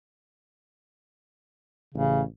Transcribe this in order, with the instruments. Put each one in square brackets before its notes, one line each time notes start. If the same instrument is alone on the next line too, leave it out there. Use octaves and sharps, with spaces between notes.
[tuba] A1 [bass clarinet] C#3